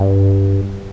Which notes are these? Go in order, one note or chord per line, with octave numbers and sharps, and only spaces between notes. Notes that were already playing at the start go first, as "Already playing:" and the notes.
Already playing: G2